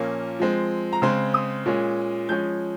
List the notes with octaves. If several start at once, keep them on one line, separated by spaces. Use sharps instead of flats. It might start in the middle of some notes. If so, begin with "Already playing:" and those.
Already playing: A#2 F3 A#3 C#4
F3 G#3 C4
A#5
C#3 G#3 C4 C6
D#6
A#2 G#3 C#4
F3 G#3 C#4 G6